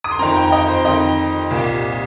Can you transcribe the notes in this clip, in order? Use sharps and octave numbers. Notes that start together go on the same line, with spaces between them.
D#6
C6
F2 D#3 C4 A#5
G5
D#5
C5
F2 D#3 C4 D#5
C2 A#2 A#3